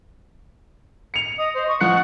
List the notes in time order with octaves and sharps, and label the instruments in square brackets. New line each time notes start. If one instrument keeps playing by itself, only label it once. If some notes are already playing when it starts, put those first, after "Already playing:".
[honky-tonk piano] C#7 F7
[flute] D#5 [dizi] D#6
[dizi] C5
[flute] C#6 [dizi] D#6
[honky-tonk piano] F3 F#6 C#7 [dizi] F#5